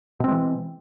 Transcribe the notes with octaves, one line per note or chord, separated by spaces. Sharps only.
B2 E3 G#3 C4